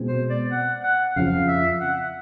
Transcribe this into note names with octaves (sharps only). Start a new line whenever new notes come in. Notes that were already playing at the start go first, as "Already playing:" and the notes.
Already playing: B2 G#3 C4
C5
D5
F#5
F#5
F2 C#3 F3 F5
E5
F#5